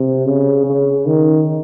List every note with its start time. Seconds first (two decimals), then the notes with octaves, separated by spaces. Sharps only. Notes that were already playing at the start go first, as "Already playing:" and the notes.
Already playing: C3
0.26 C#3
0.66 C#3
1.06 D#3